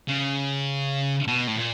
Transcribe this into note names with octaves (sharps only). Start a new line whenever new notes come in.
C#3
B2
A2
A#2